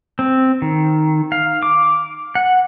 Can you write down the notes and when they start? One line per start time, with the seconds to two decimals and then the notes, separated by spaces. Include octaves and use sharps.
0.19 C4
0.62 D#3
1.32 F5
1.63 D6
2.35 F#5